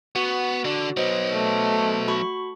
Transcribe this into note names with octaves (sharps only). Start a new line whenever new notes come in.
B3 F#4 F#5 C#6
D3 D4 F#4
F#3 B3 C5 D#5
A3
F#4 B5 C#6